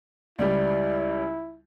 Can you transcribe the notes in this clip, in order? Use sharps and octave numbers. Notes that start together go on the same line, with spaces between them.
C#2 G3 E4 D5